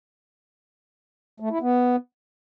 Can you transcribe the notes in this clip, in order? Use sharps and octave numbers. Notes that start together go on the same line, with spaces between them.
A3
E4
B3